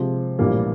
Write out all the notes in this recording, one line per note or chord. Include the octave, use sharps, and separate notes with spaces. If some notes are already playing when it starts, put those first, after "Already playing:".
Already playing: C3 F3 G#3
A#1 A2 E3 G3 A#3